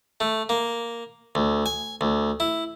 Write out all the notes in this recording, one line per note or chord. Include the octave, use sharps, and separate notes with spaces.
A3
A#3
D2
G#5
D2
E4